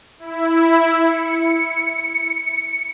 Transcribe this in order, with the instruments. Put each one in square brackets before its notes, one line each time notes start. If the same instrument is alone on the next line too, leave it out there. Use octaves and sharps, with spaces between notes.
[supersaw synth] E4
C#7